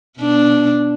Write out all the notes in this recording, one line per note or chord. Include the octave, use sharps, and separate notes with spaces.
B2 D4